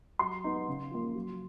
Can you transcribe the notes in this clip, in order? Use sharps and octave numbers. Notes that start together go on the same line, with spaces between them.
F#3 C6
B3 D#4
C#3
F3 A#3
F#3